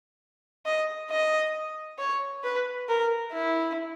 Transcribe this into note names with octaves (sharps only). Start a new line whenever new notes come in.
D#5
D#5
C#5
B4
A#4
E4